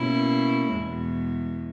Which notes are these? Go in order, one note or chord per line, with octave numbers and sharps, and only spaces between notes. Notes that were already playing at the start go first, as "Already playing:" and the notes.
Already playing: B2 A#3 C#4 E4
E2 B2 G#3